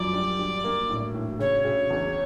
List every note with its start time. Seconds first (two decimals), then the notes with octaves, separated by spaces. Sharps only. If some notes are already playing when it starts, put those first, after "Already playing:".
Already playing: F#2 F3 D5
0.13 G3
0.39 G3
0.64 A#3
0.89 A2
1.14 A2
1.39 C#3 C#5
1.65 C#3
1.90 E2